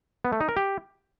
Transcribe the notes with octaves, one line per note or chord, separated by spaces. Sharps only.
B3
A3
D#4
A#4
G4